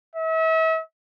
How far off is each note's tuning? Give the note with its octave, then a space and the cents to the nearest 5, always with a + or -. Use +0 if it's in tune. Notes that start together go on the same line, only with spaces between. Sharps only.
E5 -40